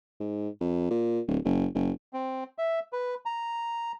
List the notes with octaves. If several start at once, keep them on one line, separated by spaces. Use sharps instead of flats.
G#2
F2
A#2
D1
F#1
F#1
C4
E5
B4
A#5